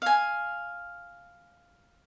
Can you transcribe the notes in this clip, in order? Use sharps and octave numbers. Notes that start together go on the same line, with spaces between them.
F5 G#5